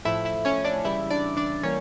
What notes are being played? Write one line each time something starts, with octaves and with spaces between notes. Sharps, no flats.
A2 F3 A3 E4 E5
E4 E5
C#4 C#5
D4 D5
C#3 E3 G3 E4 E5
D4 D5
D4 D5
E3 G3 A#3 C#4 C#5